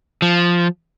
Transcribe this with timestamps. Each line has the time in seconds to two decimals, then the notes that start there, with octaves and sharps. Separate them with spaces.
0.22 F3